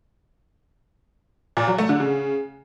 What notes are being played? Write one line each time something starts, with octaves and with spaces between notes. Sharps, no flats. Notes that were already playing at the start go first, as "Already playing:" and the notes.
A#2
F#3
A3
D3
C#3